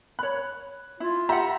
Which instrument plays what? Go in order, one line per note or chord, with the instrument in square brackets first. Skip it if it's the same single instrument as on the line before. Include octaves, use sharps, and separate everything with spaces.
[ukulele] C#5 B5 [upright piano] F#6
[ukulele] E4 [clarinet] F4
[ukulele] G4 F#5 [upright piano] E5 A#5